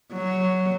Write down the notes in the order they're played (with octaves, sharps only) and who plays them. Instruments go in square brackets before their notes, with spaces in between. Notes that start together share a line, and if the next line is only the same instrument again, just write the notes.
[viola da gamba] F#3